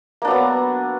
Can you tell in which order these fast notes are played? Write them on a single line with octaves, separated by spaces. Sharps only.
A#3 D4 F#3 B3